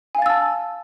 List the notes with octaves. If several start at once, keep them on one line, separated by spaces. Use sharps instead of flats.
F5 G#5 A5 E6 A6